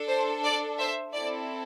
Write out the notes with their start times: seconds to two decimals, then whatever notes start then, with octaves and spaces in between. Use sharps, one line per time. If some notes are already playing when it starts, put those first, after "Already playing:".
Already playing: D4 A4
0.08 C5
0.44 D5
0.78 C5 E5
1.14 C4 E4 A4 D5